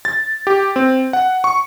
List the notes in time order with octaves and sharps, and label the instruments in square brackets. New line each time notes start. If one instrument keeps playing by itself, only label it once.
[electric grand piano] A6
G4
C4
F#5
C#6